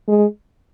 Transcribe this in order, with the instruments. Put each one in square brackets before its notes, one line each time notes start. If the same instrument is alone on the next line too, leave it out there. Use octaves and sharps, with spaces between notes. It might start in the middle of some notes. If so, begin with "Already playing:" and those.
[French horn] G#3